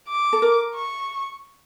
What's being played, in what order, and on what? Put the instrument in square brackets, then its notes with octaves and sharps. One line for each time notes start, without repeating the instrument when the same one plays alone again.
[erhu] D6
[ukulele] A4
A#4
[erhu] C#6